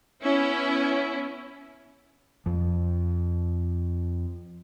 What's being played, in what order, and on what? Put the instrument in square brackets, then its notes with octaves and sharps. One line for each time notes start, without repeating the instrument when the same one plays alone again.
[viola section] B3 C#4 E4
[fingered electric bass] F2 F3